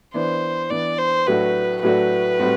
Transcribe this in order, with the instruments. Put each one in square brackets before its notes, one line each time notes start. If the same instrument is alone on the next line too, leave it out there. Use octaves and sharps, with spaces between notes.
[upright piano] E3 B3 D4 [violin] C5
[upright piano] E3 B3 D4 [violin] D5
[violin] C5
[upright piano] A2 F#3 A3 D4 F#4 [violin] B4
[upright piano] A2 F#3 A3 D4 F#4 [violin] B4
[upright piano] A2 G3 C4 F#4